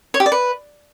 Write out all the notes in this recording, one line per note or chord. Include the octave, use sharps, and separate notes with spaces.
C#5
G4
D5
B4